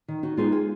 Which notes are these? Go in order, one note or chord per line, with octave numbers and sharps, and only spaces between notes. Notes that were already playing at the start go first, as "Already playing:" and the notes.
D#3
D#4 F#4
G#3 B3 D#4 F4 G#4
F4 G#4